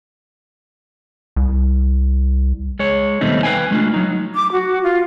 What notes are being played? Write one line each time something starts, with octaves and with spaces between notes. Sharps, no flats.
C2
G#3 C#5
D#2 B2 G3 A3 C4 D#4
B4 F5 G5 G#5
G#3 A3 D4 F4
F#3 D#4
D6
F#4
F4